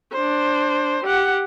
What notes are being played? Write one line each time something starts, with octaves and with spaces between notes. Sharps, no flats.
D4 C5
G4 F#5